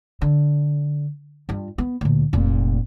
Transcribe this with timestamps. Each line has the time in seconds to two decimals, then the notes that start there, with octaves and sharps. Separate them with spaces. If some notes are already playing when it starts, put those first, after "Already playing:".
0.22 D3
1.49 G2 F4
1.78 B3
2.01 D2 A#2
2.33 F1 A#2